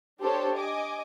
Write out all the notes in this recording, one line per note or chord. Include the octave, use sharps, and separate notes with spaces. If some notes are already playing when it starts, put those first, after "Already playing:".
D4 G4 A4 C5 C#5
D#5 G#5 D6